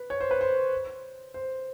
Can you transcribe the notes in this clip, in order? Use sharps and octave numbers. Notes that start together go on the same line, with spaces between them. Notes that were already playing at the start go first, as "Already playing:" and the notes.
Already playing: B4
C#5
C5
B4
C5
C5